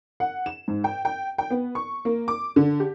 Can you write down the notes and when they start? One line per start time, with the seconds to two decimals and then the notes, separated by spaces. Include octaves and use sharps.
0.20 F#5
0.46 E7
0.68 G#2
0.84 G5
1.05 G5
1.38 G5
1.50 B3
1.75 C#6
2.05 A#3
2.28 D6
2.56 D3
2.80 G4